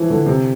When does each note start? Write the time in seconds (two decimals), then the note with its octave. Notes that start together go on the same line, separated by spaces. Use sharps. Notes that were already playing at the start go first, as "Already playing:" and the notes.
Already playing: E3 F3
0.10 D3
0.26 C3